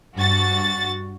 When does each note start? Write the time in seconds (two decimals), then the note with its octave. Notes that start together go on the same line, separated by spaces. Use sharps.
0.14 G2 F#4 A6